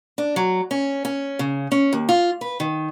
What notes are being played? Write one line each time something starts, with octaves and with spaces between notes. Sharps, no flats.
D4
F#3
C#4
C#4
C#3
C#4
D#2
F4
B4
D#3